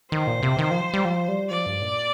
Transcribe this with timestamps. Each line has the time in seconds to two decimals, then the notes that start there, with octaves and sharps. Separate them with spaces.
0.12 D#3 C5
0.27 A#2
0.43 C3
0.59 D#3
0.71 F3
0.94 G3
1.05 F3
1.28 G3
1.50 F3 D5
1.66 G2
1.82 A#2